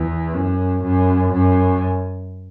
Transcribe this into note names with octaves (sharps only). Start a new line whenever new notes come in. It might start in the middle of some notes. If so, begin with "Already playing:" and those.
Already playing: E2
F#2
F#2
F#2